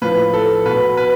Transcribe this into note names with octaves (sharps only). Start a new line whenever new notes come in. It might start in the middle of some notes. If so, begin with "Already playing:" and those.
A2 F3 B4
A4
B2 B4
B4